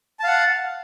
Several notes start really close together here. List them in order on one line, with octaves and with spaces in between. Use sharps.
A5 F5 F#5